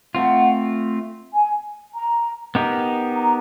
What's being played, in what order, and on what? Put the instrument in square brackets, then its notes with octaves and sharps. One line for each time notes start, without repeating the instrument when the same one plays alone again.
[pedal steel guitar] A3 C4 F4 [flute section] F#5
[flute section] G#5
A#5
[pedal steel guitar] B3 D#4 G4 A#4
[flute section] A#5